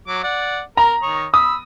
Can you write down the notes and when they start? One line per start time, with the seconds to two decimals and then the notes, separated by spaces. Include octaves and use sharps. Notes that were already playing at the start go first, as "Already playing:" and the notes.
0.08 F#3 D6
0.23 D5 F#5
0.77 A#4 A#5
1.02 D#3 C#5 D#6
1.34 B5 D#6 E6